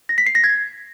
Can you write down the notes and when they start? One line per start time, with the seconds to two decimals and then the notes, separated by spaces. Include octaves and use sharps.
0.09 A#6
0.18 B6
0.26 C7
0.35 A#6
0.44 G#6